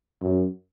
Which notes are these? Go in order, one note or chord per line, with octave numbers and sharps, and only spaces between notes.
F#2